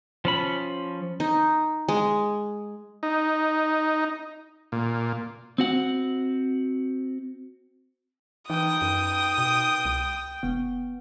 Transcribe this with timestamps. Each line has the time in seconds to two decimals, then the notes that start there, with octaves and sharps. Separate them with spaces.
0.25 F3 C#4 B5
1.20 D#4
1.88 G#3
3.03 D#4
4.72 A#2
5.58 C4 F#4 F#5
8.50 E3 D#4 B4 G5 D#6
8.81 F#2
9.38 B2
9.85 C2
10.43 E1 B3